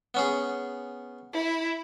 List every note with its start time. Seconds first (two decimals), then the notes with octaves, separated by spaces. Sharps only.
0.14 B3 C#4 G#4
1.33 E4